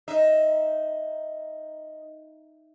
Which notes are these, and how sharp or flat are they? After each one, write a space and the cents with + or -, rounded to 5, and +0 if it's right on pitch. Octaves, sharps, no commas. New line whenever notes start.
D#4 +0 E5 +0